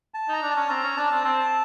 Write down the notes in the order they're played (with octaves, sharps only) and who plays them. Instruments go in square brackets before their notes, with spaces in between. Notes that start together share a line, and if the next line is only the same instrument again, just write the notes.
[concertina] A5
[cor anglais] D#4
[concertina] A#5
[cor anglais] D4
[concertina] A5
[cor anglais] C#4
[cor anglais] C4 [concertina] A#5
[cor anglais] C#4
[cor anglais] D4 [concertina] A5
[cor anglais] C4
[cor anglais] C4 [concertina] A5